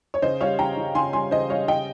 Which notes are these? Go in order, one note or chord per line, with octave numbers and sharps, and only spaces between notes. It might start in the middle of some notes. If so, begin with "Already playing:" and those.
C#5
C#3 C5 D#5
G3 C#5 F5
C#3 G5 A#5
C#3
C#3 G#5 C6
G3 G#5 C6
C#3 C5 D#5
G3 C#5 F5
C#3 D#5 G5